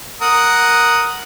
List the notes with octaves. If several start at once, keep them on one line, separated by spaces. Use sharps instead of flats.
A#4 F#5 D#6